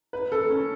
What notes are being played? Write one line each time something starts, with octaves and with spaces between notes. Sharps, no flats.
B4
A4
C#4